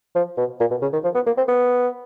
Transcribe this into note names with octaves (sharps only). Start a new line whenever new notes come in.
F3
B2
A#2
B2
C#3
D#3
F3
B3
A#3
C4
B3